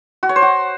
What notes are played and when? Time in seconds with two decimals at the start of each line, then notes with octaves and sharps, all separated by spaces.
0.23 F#4
0.29 C#5
0.36 C5
0.42 F#4